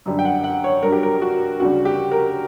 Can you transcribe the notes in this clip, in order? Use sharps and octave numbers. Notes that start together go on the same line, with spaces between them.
F#2 D3 G3
G5
F#5
F#5
C#5
G2 F#3 A#4
G4
A#4
F#4
D2 C#3 G3 F#4
G4
A#4